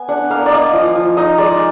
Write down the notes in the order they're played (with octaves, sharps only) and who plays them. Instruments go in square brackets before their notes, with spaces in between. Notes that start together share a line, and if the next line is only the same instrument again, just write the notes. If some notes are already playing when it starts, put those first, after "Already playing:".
Already playing: [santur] B3 G#5
D4 F#5
A#3 F5
D5
A#3 D#5
F3
F3
D#4 D#5
G#3 D5